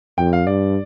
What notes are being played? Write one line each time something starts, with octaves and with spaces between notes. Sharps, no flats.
F2 G5
F5
G2 D5